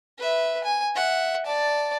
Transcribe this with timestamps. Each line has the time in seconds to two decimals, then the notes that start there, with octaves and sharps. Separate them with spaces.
0.19 B4 E5
0.64 G#5
0.95 E5 F#5
1.45 D5 A5